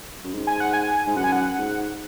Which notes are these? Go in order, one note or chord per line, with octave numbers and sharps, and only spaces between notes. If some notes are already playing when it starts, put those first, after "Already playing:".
F#2
G#2
G#5
F#5
G#5
G#2
F#2 F#5
G#5
F#5
G#2